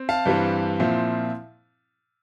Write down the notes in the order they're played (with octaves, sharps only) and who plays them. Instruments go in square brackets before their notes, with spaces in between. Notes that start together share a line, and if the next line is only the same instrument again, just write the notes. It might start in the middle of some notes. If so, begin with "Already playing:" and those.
Already playing: [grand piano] C4
F5 A5
G2 E3 G3 C4
A#2 F3 C4 E4